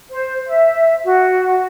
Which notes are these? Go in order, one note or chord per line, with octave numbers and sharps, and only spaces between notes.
C5
E5
F#4